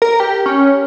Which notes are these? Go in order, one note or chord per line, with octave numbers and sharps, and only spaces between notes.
A#4
G4
C#4